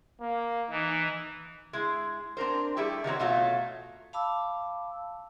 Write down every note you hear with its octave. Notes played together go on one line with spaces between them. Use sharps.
A#3
E3 D#4
G#3 E4 G#4
C4 D4 A#4 C5
G3 A3 E4 G4 G#4
D#3 E3 F#3 C4
B2 F#3 A3 F4
F5 A5 B5 D6 E6